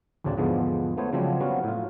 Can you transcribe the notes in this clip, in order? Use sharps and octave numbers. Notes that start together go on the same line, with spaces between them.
A1 D2 C#3 C4 D4 A5
E2 G#2 D3 F3 G#3 B3
A3 B3 C5 C#5
C#3 F3 F#3 G#3 C4 D4
F#3 G3 B3 C#4 F4 F#4
A2 F4